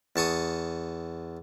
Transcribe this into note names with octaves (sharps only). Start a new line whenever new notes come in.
E2 A5 C#6 D#6